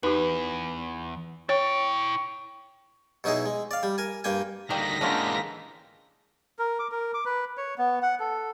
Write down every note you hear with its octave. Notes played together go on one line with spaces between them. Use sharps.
E2 D#4 G4 B4
E4 C#5 G5 C#6
B2 F#3 D#4 E4 G#4
G#3
D5 F5
G3
A#4 G#5
G2 A#3 G5 G#5
D2 D#3 G3 A#3 G5 A#6 B6
D3 E3 G#3 A#3 C#4 D#4 F4 G4
A#4
D6
A#4
D6
B4
C#5
B3
F#5
A4